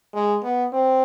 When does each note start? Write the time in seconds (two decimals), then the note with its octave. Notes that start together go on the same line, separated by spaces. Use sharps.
0.14 G#3
0.43 B3
0.73 C4